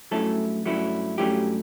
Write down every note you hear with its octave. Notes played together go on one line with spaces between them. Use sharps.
G2 F#3 A3 C#4 E4 A4
G2 F#3 A3 C#4 E4
G2 F#3 A3 C#4 E4 G4